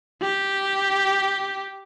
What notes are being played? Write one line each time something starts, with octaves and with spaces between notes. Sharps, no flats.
G4